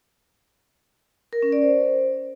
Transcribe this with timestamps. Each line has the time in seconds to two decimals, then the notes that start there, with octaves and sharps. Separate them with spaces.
1.33 A#4
1.43 C#4
1.52 D5
1.62 C5